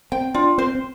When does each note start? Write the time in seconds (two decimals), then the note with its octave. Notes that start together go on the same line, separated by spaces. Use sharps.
0.12 C4 G5
0.34 D4 F4
0.58 C4 C5
0.75 C4